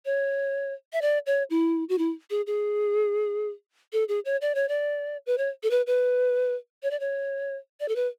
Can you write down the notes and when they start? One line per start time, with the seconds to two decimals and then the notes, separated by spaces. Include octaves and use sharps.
0.05 C#5
0.93 E5
1.02 D5
1.26 C#5
1.50 E4
1.89 F#4
1.98 E4
2.30 G#4
2.47 G#4
3.93 A4
4.08 G#4
4.25 C#5
4.41 D5
4.55 C#5
4.68 D5
5.26 B4
5.38 C#5
5.63 A4
5.71 B4
5.87 B4
6.83 C#5
6.91 D5
7.00 C#5
7.80 D5
7.88 A4
7.96 B4